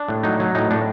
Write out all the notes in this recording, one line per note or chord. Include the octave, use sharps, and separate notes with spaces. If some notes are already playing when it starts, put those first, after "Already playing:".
Already playing: D4
A2
F#3 D#4
F#3
A2 D#4
A2 D4